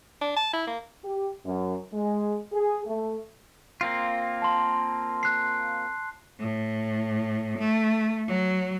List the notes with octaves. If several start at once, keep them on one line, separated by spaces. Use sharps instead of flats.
D4
A5
E4
A#3
G4
F#2
G#3
G#4
A3
A#3 C4 F4
A5 C6
F#6 C7
A2
A3
F#3